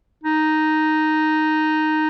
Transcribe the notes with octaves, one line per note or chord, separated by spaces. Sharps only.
D#4